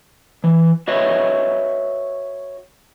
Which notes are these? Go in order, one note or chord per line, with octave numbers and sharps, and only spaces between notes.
E3
F#4 B4 C#5 D#5 E5